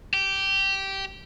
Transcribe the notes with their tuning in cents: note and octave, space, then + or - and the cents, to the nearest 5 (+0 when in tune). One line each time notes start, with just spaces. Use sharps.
G4 -10